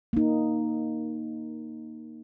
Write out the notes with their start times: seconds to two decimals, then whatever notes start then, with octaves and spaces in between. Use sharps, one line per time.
0.13 A#3 D#4